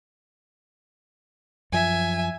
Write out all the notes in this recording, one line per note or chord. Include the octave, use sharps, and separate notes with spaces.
F#2 F3 E5 G#5